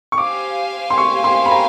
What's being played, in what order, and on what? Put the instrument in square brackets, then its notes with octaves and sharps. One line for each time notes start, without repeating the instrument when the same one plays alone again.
[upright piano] C#6
[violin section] G4 C5 F5 G#5 [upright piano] D6
[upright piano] C6
C#6
C6
B5
A#5